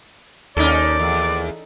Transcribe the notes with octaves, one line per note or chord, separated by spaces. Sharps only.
D#2 C#4 D#4 A4 D5
E2